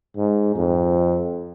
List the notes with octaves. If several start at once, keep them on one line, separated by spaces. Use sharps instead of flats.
G#2
F2